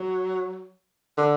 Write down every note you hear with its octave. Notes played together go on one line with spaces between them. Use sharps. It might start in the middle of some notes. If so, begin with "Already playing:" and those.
Already playing: F#3
D3